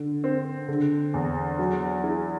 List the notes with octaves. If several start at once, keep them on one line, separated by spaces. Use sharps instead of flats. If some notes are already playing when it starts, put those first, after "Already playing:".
Already playing: D3
C4
D3
E2
F#3
E4